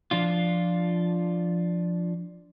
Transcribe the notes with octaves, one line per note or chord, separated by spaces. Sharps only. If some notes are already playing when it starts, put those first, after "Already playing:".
F3 D4 F4